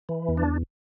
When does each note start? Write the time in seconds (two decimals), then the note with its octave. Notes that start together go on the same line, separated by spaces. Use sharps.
0.09 E3
0.28 E2
0.37 D4